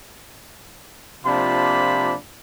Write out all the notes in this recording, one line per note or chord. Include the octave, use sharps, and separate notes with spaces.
C3 F3 A#3 D4 F4 B5